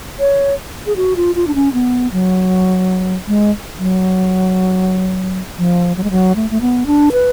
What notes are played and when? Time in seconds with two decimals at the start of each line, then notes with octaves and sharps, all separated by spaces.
0.20 C#5
0.86 G#4
0.96 F#4
1.16 F4
1.35 F4
1.48 D4
1.55 C#4
1.73 B3
2.13 F#3
3.28 G#3
3.78 F#3
5.58 F3
5.97 F#3
6.04 G#3
6.11 F#3
6.36 A3
6.50 A3
6.61 B3
6.86 D4
7.12 B4